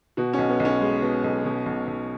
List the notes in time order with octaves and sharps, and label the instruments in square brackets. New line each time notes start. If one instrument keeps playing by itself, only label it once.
[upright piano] B2 F#4
B1 C#4
B3
B1
C#4
G#3
B2
B1
B2
B1
B1